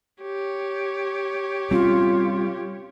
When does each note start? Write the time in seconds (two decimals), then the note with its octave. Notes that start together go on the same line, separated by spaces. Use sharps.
0.22 G4 C#5
1.71 G3 C4 C#4 F4